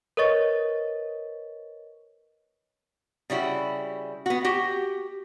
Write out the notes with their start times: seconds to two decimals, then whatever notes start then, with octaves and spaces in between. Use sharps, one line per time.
0.17 A#4 B4 C#5 D#5 C#6 A6
3.30 C#3 G3 E4 F#4
4.26 B3 F#4
4.44 F#4 G4